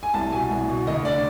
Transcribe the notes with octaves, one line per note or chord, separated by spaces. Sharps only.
G#5
C2 A5
B2 G#5
C2
B2
D2 D#5
D3 D5